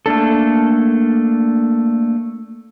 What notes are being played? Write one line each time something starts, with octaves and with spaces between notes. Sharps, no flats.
A3 A#3 D4 A4